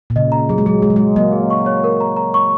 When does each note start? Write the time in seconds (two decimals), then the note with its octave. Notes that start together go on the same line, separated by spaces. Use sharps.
0.10 A#2
0.16 C#3 D#5
0.32 A#5
0.49 F#3 G#4
0.58 G#3
0.66 F#3 G#4
0.82 G#3 G#4
0.90 F#3
0.96 G#3 G#4
1.16 F#3 A#3 D#5
1.32 G#4
1.50 C#6
1.66 C#5
1.84 A#4
2.00 A#5
2.17 A#5
2.34 C#6